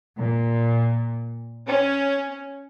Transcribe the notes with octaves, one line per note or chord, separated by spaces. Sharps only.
A#2
C#4